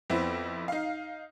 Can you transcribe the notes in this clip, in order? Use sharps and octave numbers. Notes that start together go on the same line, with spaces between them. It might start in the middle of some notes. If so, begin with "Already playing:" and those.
F2 B3 C4 E4
D#4 F5